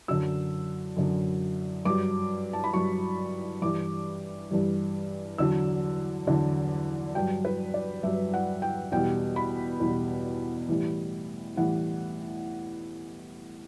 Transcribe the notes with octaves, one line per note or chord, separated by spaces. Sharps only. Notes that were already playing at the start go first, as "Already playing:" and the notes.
F#2 D3 F#3 E6
F#2 D3 F#3
G2 F#3 D6
A5
B5
G2 F#3 C#6
G2 E3 G3 D6
G2 E3 G3
E2 D3 F#3 E6
E2 D3 F#3
G2 F#3 G5
B4
D5
G2 F#3 E5
F#5
G5
E2 B2 G3 G5
B5
E2 B2 G3
A2 E3 G3
A2 E3 G3 F#5